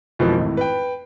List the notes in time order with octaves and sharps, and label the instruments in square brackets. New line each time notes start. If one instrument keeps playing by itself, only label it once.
[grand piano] F2 B2 E3 F3 G#3 A#3
G#1 A2
B4 G5